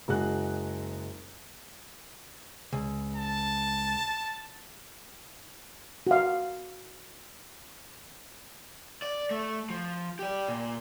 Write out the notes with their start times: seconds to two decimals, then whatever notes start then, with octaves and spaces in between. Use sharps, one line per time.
0.08 F#1 G#3 F#4 F#6
2.73 C#2
3.16 A5
6.07 F#4 F5
9.02 D5
9.31 A3
9.70 F3
10.19 G4 D5
10.48 A#2